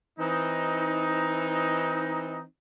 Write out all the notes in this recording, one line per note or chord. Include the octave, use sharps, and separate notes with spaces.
E3 C4 D#4